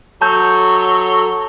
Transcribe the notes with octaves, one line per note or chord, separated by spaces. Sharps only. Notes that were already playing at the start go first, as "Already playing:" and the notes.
F#3 A4 A5 G6